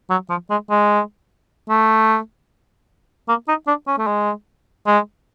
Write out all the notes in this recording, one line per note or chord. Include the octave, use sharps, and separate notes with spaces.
F#3
F3
G#3
G#3
A3
A#3
D#4
D4
C#4
A3
G#3
G#3